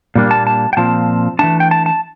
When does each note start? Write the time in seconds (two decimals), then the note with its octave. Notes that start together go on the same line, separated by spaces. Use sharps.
0.15 A#2 G3 A#3 D4
0.31 A5
0.47 A5
0.73 G5
0.77 A#2 F3 C4 A5
1.39 E3 A3 D4 A5
1.60 G5
1.71 A5
1.86 A5